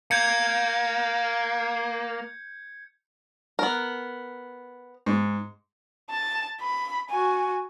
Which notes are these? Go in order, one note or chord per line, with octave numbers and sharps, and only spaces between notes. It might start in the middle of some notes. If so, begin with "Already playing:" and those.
A#3 G6 G#6 C#7
B3 A#4
G#2
A5
B5
F#4 G#5